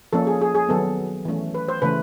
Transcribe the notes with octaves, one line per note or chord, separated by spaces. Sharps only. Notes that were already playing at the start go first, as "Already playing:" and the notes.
F3 A#3 C#4 A4
G#4
G#4
G#4
D#3 F#3 B3 A4
E3 A3 C#4
B4
C5
C#3 E3 A3 B4